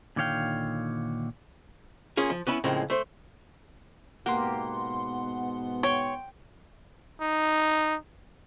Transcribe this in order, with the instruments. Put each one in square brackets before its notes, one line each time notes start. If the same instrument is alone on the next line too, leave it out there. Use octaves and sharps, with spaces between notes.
[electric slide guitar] A#2 D3 D#3 C#5 F5 G5
[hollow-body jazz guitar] A#3 C#4 F4 G#4
F3
B3 C#4 E4 B4
A2 C#3 F3 G#3 A#3 C4
A3 C5
[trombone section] G#2 B2 B3 [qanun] A#3 G4 [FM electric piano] F#5 C6
[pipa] C#5 [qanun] G5
[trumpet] D#4